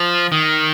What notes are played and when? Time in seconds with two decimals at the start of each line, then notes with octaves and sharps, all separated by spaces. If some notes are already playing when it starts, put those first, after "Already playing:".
Already playing: F3
0.32 D#3